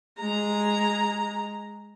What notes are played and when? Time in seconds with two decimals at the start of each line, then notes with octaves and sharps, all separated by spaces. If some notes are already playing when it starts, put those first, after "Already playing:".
0.19 G#3 A#5